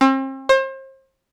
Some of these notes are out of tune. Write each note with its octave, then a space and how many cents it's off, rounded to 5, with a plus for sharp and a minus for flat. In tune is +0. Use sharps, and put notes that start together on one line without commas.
C4 +40
C5 +35